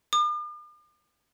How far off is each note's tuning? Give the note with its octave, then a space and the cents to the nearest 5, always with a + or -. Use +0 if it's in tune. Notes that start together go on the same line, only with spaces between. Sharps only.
D6 +45